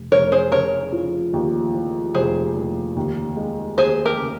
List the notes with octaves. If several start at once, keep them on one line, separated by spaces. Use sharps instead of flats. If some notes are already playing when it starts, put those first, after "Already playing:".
Already playing: F1
F1 A#4 C#5
G#4 C5
C#3 A#4 C#5
F3
D#2
F3
F1 G#4 C5
F1
D#2
G#3
D#2 G#4 C5
G4 A#4
C#3